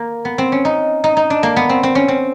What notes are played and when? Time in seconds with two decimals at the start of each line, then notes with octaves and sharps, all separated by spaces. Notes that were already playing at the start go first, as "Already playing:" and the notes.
Already playing: A#3
0.25 B3
0.38 C4
0.52 C#4
0.65 D#4
1.04 D#4
1.17 D#4
1.30 D4
1.43 A#3
1.56 B3
1.69 C4
1.83 C4
1.95 C#4
2.08 C4